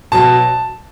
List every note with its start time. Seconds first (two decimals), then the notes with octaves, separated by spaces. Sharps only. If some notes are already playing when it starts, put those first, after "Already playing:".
0.12 B2 F#3 A5